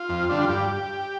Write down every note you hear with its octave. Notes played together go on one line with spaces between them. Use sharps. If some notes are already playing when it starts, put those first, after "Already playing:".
Already playing: F4
F2
D3 G3 D4
F4
G2 G4